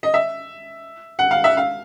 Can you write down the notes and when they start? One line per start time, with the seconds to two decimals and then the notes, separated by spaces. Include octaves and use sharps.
0.03 D#5
0.14 E5
1.19 F#5
1.31 F5
1.44 E5
1.57 F5